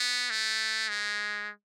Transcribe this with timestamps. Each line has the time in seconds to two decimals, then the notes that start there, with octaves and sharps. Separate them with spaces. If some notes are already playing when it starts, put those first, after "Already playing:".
Already playing: B3
0.30 A3
0.89 G#3